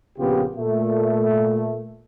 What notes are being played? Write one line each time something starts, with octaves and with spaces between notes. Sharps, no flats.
A#1 C#3 B3 F4 G4
A#2 A3